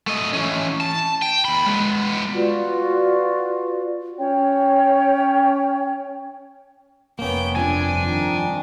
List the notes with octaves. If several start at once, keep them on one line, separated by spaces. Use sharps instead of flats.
A3 D#5
E3 C#4
A5
G5
D#2 B5
G#3 B3
F4 F#4 B4 D5
C#4 C#5 G5
F1 A#3 B3 C#4 G5
G2 F3 C4 D4 G#5
D#3